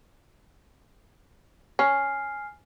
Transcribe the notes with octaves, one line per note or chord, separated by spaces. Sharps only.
C#4 G#5 F6 C7